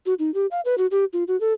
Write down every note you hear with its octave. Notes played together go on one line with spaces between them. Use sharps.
F#4
D#4
G4
F5
B4
F#4
G4
F4
F#4
A4